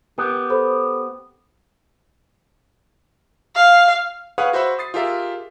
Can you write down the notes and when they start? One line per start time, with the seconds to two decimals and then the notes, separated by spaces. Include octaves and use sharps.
0.18 B3 G4 A#4
0.50 A4 C5 B5
3.56 F5
4.38 G#4 B4 C#5 F5 F#5 D#6
4.53 F#4 C5 E5 B5
4.79 D#6 A6 C7
4.94 F4 G4 G#4 A#4 E5